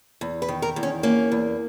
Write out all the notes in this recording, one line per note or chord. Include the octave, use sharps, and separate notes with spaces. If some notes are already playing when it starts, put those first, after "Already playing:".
E2
B4
D#3
A#4
E2
C#4
A#3 C#4
E2